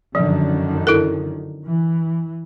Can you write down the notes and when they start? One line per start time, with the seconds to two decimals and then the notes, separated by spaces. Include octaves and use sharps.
0.15 F#2 D3 D#3 F3 F#3
0.87 E4 A4 A#4
1.64 E3